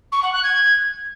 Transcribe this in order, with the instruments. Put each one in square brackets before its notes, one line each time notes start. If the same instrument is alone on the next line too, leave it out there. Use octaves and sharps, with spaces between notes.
[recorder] C#6
F#5
F#6
G#6